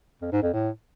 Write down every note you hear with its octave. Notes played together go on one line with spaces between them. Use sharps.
F2
G#2
F2
A2